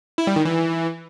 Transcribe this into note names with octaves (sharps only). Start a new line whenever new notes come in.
E4
G3
D#3
E3